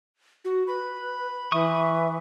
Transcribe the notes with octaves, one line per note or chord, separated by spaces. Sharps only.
F#4
B4 B5
E3 E5 C#6 D#6